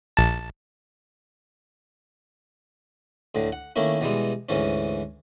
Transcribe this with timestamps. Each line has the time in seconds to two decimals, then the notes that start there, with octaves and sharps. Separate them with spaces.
0.17 A#1 A5
3.35 D2 A2 D3
3.52 F#5
3.76 D#3 A3 A#3 C#4 E4
4.01 B2 E3 G3 G#3
4.49 D2 G#2 E3 C#4